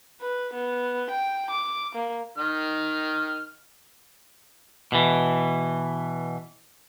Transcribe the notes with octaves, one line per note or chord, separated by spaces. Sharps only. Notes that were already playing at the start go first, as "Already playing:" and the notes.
B4
B3
G5
D6
A#3
D#3 F6
B2 E3